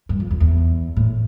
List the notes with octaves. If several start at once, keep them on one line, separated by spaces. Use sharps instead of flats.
G2
F2
F2
E2
A2